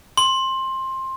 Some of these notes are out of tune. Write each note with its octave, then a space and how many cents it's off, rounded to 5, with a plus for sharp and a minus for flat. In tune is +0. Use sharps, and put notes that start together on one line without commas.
C6 +15